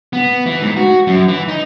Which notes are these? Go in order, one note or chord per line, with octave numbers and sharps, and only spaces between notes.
B3
E3
G#2
F#4
F#2
E3
D#4